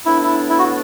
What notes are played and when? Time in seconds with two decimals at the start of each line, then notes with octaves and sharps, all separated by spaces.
0.05 A2 E3 B3 D4 E4
0.23 E4
0.49 E4
0.59 F#4